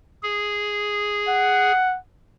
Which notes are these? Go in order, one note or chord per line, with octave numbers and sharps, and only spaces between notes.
G#4
F#5